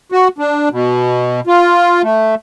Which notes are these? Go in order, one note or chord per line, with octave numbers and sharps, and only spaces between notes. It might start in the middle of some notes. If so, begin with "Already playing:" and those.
F#4
D4
B2
F4
A3